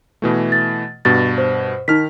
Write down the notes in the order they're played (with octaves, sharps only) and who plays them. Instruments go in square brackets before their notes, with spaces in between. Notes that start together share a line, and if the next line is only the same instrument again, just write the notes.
[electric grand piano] B2 E3 A3
[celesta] A6
[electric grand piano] G2 B2 [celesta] A6
[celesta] C5
[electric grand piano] D#3 F6 [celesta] D#4 B6